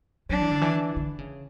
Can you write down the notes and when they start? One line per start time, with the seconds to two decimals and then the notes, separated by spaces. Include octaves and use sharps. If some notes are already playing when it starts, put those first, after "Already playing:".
0.30 F#3 D4
0.41 E3
0.51 D3
0.62 E3
0.97 D3
1.19 C#3